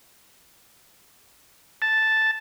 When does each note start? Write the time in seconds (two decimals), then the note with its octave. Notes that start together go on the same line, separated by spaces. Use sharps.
1.82 A5